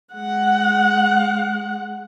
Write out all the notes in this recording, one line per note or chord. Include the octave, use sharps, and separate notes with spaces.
G#3 F#5